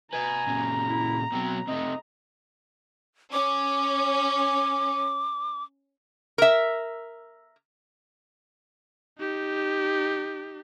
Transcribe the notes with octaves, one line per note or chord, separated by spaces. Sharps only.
B4 D#5 G#5 A#5
A#2 C#3
E4
B2 F#3 C4
C3 A3 D#5
C#4 D6
A#4 E5
D#4 G4